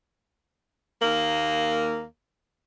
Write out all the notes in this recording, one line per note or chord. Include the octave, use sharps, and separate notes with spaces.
D#2 A#3